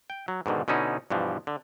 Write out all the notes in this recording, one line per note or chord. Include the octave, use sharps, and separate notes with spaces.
G5
F#3
G#2 B2 D3 D#3
B2 D3 C#4 D#4 E4
G2 B2 E3 F3
D3